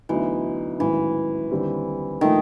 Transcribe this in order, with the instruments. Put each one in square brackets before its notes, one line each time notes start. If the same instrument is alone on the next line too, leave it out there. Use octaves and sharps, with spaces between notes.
[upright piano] D2 D3 F#3 B3 D#4 [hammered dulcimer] E3
[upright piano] A1 G#2 D#3 F#3 [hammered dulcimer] E3
[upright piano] D#2 D3 G3 C4
[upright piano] A#2 F3 A3 [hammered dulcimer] D#3